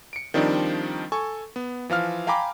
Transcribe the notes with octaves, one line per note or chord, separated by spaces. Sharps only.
C#7 D7
D#3 F3 G3 C4 D4 D#4
A4 G#5 C#6
B3
E3 F3 F5 F6
F5 G5 G#5 A#5 B5 D6